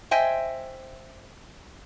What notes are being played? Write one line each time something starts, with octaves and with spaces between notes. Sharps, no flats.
C5 D#5 E5 G5 G#5